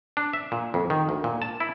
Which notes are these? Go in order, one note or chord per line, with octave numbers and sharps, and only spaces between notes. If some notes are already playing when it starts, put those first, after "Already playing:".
D4
E5
A#2
F2
D#3
D2
A#2
A5
E4